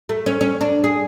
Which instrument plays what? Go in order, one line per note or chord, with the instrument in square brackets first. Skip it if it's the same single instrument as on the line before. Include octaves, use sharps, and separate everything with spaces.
[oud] A3
C#4
C#4
D4
G#4